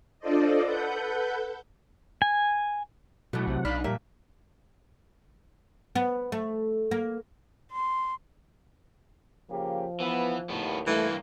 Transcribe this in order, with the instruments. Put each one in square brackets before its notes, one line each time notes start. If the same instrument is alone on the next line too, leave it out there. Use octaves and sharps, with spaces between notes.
[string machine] D4 F4 A4 C5 D5 D#5
A4 B4 F#5 G6
[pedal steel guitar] G#5
[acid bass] B2 [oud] E3 A3 [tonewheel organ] F#3 F#5
[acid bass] B1 [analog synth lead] C3
[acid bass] B1 [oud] D4 D#4 [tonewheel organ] F5 [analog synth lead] B5
[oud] F2 A#2 E5 [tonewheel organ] G3 [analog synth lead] A#4
[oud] B3
A3
A#3
[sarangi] C6
[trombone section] C#3 A#3 G4 [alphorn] F3
[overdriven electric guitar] E3 [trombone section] B3
[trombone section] D#2 [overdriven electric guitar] A2 B3
[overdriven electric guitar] G2 A#3 [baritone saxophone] E3 [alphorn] A3